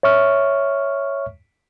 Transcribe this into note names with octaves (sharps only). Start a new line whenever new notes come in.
C#5 E5 C#6 F6